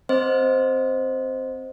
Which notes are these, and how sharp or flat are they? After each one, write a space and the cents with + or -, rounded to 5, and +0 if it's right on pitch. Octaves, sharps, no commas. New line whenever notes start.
C4 +0 C5 +0 D#5 +0